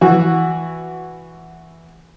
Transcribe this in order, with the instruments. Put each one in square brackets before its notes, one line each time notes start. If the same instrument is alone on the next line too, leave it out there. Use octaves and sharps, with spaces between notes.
[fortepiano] E3 F#4